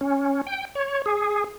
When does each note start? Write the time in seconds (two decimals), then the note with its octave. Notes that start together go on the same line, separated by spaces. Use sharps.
0.01 C#4
0.47 G5
0.75 C#5
1.06 G#4